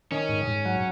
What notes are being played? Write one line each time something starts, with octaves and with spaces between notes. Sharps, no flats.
D#3 C#4
G#2
G#2
F#3